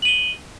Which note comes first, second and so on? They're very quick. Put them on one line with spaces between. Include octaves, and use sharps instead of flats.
F#7 D#7 G7